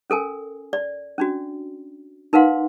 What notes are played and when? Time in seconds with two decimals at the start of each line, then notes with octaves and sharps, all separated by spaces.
0.10 C#4 A4 A#4 G#5
0.73 D5
1.18 C#4 D4 F#4
2.33 D#4 A#4 B4 F5 F#5 C6